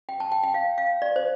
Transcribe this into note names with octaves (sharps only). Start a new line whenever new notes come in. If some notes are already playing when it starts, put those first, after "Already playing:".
G5
A5
G5
G5
F5
F5
D5
C5